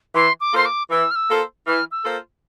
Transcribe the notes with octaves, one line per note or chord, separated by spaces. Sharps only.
E3 C6
D6
A#3 F4 A4 C5 C6
D6
E3 E6
F6
E6
A#3 F4 A4 C5
E3 F6
E6
A#3 F4 A4 C5